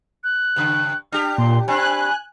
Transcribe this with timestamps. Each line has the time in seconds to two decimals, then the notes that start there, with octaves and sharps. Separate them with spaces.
0.24 F#6
0.56 G2 C#3
1.12 D4 G4 F6
1.38 A#2 C6
1.68 C4 D4 G#5 B5 F#6